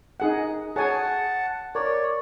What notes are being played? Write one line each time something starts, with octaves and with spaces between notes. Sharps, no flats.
D#4 G#4 F#5
G#4 C#5 F#5 G#5 A5
A#4 C#5 D5